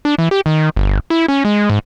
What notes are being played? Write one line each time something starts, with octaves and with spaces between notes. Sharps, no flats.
D4
E3
G4
D#3
G1
E4
C#4
G#3
G#2